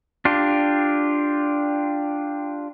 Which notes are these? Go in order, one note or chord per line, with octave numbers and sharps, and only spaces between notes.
D4 F4 G4